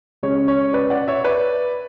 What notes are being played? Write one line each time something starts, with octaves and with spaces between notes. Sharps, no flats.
C#3 G#3 C#4 C#5
C#5
B4 D5
D5 F#5
C#5 E5
B4 D5